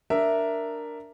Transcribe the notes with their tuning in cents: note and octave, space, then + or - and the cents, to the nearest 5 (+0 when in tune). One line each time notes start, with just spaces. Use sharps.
D4 +0 A#4 -5 E5 +0